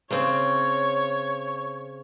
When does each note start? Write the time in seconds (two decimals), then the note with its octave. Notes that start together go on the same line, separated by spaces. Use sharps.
0.11 C#3 C4 C#5